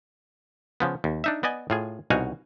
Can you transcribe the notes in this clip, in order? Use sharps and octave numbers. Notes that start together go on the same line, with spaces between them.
C#3 F3 B3
D#2
D4 D#4 E5
B3 D5 D#5 G#5
A2 F4 G#4
C2 B2 D#4 F#4 F5 G#5